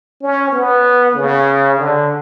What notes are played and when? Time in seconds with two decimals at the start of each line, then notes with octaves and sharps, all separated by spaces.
0.22 C#4
0.52 B3
1.16 C#3
1.79 D3